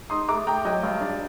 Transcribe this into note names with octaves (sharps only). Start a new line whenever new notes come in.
D#4 C6 D#6
A3 A#5 D6
A3 G5 A#5
F#3 D#5 G5
G2
D4